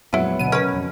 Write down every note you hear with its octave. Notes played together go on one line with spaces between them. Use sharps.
F2 A#2 F#3 G#3 B3 E4 F4
D1 B2 D3 D#7
C#3 C#4 A#4 B4
F2 C#3